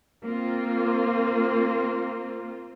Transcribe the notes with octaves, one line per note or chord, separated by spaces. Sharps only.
A#3 C4 F4